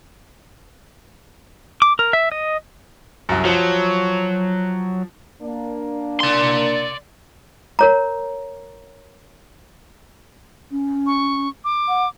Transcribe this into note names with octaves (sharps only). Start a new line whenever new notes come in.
D6
A#4
E5
D#5
C2 F#2
F3 F#3
A#3 D4
D5 C6
A#4 C#5 A#5
C#4
C#6
D6
F#5